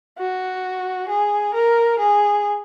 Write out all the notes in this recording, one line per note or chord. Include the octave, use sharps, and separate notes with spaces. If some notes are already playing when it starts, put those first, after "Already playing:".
F#4
G#4
A#4
G#4